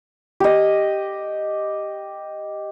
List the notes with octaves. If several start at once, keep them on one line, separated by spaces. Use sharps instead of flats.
G4 D#5